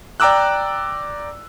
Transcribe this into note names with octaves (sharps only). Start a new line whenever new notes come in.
D5 G5 A#5 D6 E6 F#6